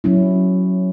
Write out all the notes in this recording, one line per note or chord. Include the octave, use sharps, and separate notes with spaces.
F#3 C#4 E4